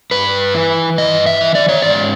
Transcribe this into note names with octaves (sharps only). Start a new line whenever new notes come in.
G2 B4
E3
G2 D#5
E5
E3
D5
C#5
G#2 D5